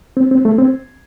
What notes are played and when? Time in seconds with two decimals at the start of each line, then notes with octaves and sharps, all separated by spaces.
0.17 C4
0.31 C4
0.45 A3
0.58 C4